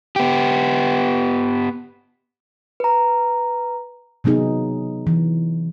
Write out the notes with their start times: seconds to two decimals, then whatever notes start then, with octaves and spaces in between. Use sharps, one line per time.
0.16 B3 G4
2.80 B4 A#5
4.24 C3 F#3 B3 D#4 G#4
5.07 E3